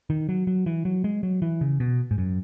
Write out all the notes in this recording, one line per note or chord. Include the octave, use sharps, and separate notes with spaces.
D#3
F#3
F#3
E3
F#3
G#3
F#3
E3
C#3
B2
G#2
F#2